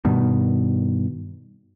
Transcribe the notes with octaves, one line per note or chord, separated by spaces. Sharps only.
G2 B2 D#3